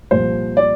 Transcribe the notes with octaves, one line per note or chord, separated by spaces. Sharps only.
C2 A#2 F3 C5
D5